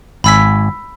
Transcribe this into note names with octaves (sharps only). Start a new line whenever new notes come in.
G#1 G#5 B5 E6 B6